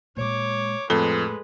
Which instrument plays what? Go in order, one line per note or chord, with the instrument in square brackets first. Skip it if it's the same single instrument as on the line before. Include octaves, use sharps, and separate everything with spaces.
[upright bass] A#2 G#3 [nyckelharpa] C#5 D6
[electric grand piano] F2 [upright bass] A2 [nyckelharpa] G#3 B4 [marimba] A4